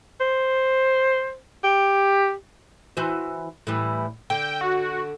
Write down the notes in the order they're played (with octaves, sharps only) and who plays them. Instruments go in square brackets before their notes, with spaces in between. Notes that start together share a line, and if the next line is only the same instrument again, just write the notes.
[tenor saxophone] C5
G4
[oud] E3 F#4 C5
A2 E3 G3
[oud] D3 [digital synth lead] G5
[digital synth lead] F#4